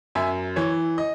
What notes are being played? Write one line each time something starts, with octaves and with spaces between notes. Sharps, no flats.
F#2 E5 G#5
E3 C#5
D#5